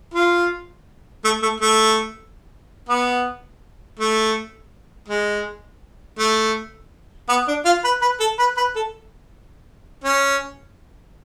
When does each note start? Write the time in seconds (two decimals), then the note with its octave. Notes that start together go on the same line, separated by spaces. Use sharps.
0.14 F4
1.25 A3
1.42 A3
1.60 A3
2.89 B3
3.99 A3
5.09 G#3
6.19 A3
7.29 B3
7.48 D4
7.65 F4
7.84 B4
8.02 B4
8.20 A4
8.39 B4
8.57 B4
8.76 A4
10.04 C#4